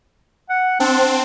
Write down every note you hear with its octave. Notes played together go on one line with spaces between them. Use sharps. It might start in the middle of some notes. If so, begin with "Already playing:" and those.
F#5
C4 D4